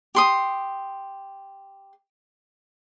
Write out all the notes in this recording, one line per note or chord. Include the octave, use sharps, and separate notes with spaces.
G4 C6 D#6